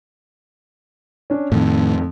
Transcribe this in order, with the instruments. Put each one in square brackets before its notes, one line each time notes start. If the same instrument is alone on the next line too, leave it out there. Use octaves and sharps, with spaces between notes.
[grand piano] C#4 D4
[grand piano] F2 [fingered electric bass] A2 D#3